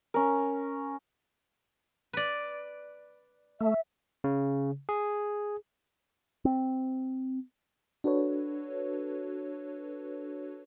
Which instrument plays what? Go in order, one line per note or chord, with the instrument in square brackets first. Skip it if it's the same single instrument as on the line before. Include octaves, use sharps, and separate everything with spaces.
[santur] C#4 A#4
[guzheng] B4 D5
[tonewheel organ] A3 [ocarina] E5
[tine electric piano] C#3
G#4
[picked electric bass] C4
[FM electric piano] D4 F#4 A4 B4 C#5